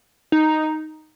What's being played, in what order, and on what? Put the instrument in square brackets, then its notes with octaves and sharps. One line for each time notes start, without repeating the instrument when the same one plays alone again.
[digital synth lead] D#4